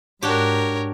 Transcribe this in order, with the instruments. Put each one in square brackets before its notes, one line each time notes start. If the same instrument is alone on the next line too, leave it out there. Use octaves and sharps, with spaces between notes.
[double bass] G#2 [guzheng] D4 F#4 G4 [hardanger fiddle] A#4 C#5